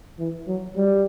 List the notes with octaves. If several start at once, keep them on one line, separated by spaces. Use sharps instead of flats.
E3
F#3
G3